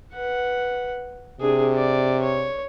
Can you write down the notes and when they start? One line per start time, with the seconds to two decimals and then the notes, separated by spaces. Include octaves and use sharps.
0.14 B4 F#5
1.41 C3 D4 G#4
1.75 D5
2.23 C#5